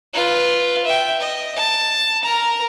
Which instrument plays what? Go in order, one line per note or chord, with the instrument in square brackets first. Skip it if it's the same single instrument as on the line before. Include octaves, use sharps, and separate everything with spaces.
[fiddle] F4 B4
E5 G5
D#5
A5
A#4 A#5